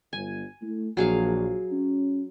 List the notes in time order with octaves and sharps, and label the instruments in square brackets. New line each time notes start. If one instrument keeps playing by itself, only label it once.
[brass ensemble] G1 [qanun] G#5
[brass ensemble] A3 E4
[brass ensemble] A#1 [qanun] F#3 G#4 F5
[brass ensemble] C#4